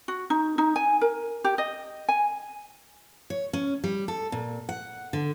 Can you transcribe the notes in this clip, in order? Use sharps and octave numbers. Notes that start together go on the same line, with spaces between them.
F#4
D#4
D#4
G#5
A#4
G4
D#5
G#5
C#5
C#4
G3
A4
A#2
F#5
D3